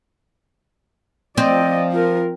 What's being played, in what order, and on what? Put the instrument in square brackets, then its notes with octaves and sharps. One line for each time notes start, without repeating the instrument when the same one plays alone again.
[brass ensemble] F3 [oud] C4 [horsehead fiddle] D5 D#5
[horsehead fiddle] F4 A#4